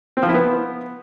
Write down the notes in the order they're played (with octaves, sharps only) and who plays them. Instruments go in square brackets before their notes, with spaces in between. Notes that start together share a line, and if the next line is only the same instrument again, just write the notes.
[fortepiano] C4
F3
E4
B3